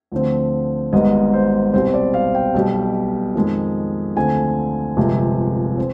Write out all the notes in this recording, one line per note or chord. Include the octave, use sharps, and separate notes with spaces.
D2 D3 F3 C4
G#1 G#2 G3 B3 D#5
C5
C2 B2 G3 C4 C5
D5
F5
G5
B1 B2 G3
F2 D#3 G#3
D2 D3 F3 C4 G#5
G1 F2 C3 F3 G#3
C4